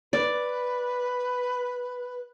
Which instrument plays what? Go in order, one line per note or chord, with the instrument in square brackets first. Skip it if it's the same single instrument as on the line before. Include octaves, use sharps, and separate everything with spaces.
[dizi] B4 [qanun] D5